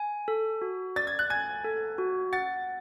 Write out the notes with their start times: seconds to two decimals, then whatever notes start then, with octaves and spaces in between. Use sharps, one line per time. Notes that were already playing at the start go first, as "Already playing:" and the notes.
Already playing: G#5
0.28 A4
0.62 F#4
0.96 D5 A6
1.07 G#6
1.19 F#6
1.30 G#5 G#6
1.65 A4
1.98 F#4
2.33 F#5 A6